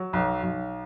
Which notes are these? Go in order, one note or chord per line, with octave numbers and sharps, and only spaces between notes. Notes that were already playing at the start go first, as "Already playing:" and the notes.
Already playing: F#3
B1
B1